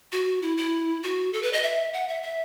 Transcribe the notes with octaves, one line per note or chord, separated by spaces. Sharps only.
F#4
E4
E4
F#4
A4
B4
D#5
E5
F#5
E5
E5